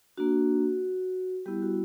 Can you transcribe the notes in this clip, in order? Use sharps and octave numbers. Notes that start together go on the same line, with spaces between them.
A#3 D4 F#4
G3 B3 E4 G4
F#4